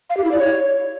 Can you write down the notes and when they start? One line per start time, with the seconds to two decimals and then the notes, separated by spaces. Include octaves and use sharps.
0.10 F5
0.17 G4
0.24 E4
0.32 D5
0.39 C#5